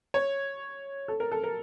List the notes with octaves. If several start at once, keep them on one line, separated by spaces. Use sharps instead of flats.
C#5
A4
A#4
A4
A#4